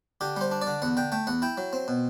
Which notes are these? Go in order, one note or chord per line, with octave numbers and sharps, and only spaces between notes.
D3 G4
G3 C5
D4
D5
D3
E2 F#5
D3 G5
A3 G5
E2 F#5
E4 G5
F#3
C4
B2